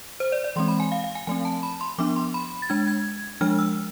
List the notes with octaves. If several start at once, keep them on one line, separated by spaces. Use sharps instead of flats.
C5
D5
D5
E3 G#3 C4 C6
B5
G#5
F5
F5
G#5
F3 A3 C4 G#5
A5
B5
C6
F3 B3 D4 D6
C6
B5
A6
G#3 D4 G#6
G#6
F3 G#3 D4 F6
E6